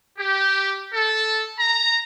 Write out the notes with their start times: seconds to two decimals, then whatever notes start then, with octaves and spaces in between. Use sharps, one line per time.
0.18 G4
0.93 A4
1.59 A#5